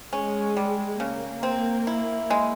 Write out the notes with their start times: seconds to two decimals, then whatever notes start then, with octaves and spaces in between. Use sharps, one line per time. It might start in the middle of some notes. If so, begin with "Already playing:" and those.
0.12 G#3 C#4
0.57 G3
1.00 C#3 A#3
1.43 C4
1.87 E4
2.30 G#3